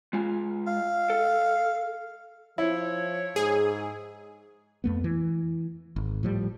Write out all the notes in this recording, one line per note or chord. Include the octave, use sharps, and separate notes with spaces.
G#3 F4 G#5
F5
A4
F3 E4 C#5
G#2 G#4
F2 A3 B3
E3
G#1
A2 F3 G3